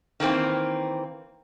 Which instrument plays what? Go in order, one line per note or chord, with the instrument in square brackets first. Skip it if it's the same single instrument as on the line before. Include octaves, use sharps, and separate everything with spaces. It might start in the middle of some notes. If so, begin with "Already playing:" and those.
[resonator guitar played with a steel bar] D#3 E3 A#3 C4